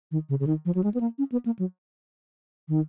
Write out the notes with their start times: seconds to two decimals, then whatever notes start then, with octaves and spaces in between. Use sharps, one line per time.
0.11 D#3
0.29 C#3
0.40 C#3
0.47 D#3
0.65 F3
0.75 F#3
0.84 G#3
0.94 B3
1.00 A#3
1.18 C#4
1.32 B3
1.46 A#3
1.59 F#3
2.68 D#3